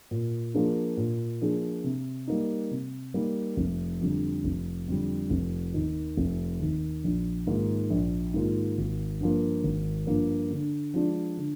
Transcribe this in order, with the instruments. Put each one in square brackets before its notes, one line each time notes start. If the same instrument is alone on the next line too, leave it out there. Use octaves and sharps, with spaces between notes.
[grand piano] A#2
F3 A#3 D4 G#4
A#2
F3 A#3 D4 G#4
C3
G3 A#3 D#4
C3
G3 A#3 D#4
F1
F2 D3 G3
F1
F2 D3 G3
F1
D#2 D#3
F1
D#2 D#3
A#1
G#2 D#3 A#3 F4
A#1
G#2 D#3 A#3 F4
G#1
G2 F3 A#3
G#1
G2 F3 A#3
D3
F3 G#3 D4 F4
D3